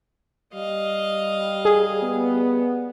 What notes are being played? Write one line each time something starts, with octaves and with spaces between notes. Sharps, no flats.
G3 D#5 F5
G#4
B3